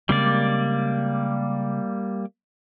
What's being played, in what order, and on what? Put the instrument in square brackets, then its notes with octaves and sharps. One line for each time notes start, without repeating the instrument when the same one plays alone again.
[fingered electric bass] C#3 G#3 C4 [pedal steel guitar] G3 A#3 D5